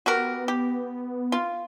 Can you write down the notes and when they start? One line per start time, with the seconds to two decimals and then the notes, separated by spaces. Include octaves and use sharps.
0.06 B3 F#4 G4 A#4
0.48 G4
1.32 F4